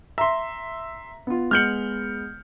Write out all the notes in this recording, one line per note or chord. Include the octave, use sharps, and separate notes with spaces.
E5 A#5 C6
B3 F4
G#3 B3 F6 G6 C#7 F#7